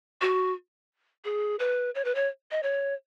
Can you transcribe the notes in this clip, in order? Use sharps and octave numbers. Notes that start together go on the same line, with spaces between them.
F#4
G#4
B4
C#5
B4
C#5
D#5
C#5